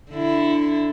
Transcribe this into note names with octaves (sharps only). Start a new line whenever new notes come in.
D3 E4